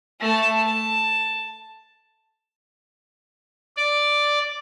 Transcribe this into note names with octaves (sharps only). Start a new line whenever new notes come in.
A3 A5
A5
D5